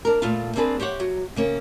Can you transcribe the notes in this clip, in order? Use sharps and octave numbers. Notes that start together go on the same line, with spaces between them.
D4 A#4
A#2 A3 B3 F4 F5
A#3 C4 D4 G#4 B4
G4 C5 C#5 F#5
F#3
C#3 A#3 C#4